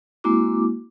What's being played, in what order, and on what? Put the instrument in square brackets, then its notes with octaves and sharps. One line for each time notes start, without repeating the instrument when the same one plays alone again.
[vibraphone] G#3 A#3 C4 E4 F#4 D6